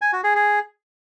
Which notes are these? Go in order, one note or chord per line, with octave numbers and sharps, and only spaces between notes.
G#5
F#4
G#4
G#4